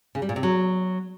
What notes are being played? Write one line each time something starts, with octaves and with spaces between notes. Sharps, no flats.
C#3
G3
A#2
C3
F#3